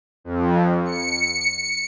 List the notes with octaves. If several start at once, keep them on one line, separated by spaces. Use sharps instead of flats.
F2
C#7